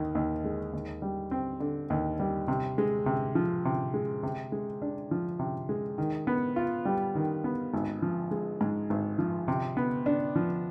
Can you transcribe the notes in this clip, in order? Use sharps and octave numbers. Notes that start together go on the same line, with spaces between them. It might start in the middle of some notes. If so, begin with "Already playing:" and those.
Already playing: D#2 D#3
D#2
G#3
D#2
G3
C4
D3
D#2
G3
C3
G#3
C3
F3
C3
G#3
C3
G#3
D4
F3
C3
G#3
D#3
B3
F4
G3
D#3
B3
G#1
F3
G#3
G#2
G#1
F3
C3
B3
D4
F3